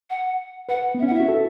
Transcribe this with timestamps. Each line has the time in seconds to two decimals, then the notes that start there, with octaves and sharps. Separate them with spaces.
0.10 F#5
0.69 B4 F#5
0.95 B3
0.99 E5
1.02 C#4
1.07 F#5
1.12 E4 E5
1.20 F#4
1.28 A4